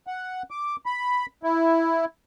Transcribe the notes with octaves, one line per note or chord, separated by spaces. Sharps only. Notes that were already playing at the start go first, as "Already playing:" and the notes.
F#5
D6
B5
E4